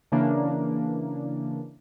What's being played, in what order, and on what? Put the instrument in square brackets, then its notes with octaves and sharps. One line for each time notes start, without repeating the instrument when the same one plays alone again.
[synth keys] C#3 E3 A#3 D4